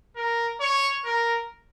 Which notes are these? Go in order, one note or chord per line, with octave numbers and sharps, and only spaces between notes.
A#4
C#5
A#4